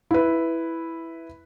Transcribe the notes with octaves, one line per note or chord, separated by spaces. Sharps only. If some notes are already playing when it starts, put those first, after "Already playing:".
E4 B4